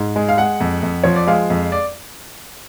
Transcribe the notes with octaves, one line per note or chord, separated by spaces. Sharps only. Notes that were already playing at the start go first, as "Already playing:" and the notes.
Already playing: G#2
G#3
F5
G#3 F#5
F2
F2
F3 C#5
D5
G#3 F5
F2
D5